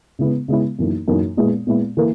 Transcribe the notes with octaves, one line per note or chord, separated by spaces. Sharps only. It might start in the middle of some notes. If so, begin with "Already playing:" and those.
C#3 G#3 B3 E4
C#3 G#3 B3 E4
F#2 E3 A#3 D#4
F#2 E3 A#3 D#4
A#2 G#3 B3 E4
A#2 G#3 B3 E4
E3 A#3